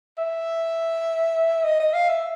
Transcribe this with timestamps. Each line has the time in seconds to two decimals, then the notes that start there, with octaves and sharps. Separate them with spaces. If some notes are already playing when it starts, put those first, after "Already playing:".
0.18 E5
1.64 D#5
1.80 D#5
1.94 F5
2.09 E5